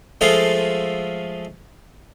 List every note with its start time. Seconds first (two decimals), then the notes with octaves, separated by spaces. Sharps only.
0.21 F3 G#3 A3 F4 A4 D#5